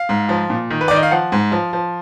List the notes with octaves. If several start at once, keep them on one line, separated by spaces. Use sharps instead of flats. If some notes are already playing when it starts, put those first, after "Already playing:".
Already playing: F5
G#2
F3
A#2
D#3
B4
D5
D#3
D#5
F5
F3 F#5
G#2
F3
F3